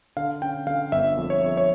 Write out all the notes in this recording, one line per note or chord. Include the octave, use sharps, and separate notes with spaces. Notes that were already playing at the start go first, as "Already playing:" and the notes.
D3 F5
C#4 G5
D3 F5
G1 E5
F2
C#5
F2
C#5